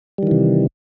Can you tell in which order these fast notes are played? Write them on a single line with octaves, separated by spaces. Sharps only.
G3 D#3 E3 C3